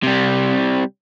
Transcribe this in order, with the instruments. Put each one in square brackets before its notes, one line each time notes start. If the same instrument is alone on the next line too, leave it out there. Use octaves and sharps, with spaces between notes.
[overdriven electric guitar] C3 G3